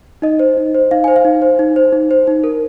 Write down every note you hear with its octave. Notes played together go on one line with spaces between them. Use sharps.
D#4 D#5
C5
D#4
C5
D#4 F5
C5 G#5
F5
D#4
C5
D#4
C5
D#4
C5
D#4
A#4